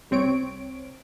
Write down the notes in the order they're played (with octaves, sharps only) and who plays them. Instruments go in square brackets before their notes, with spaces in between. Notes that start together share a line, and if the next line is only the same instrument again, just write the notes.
[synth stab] C2 C4 C#5 D7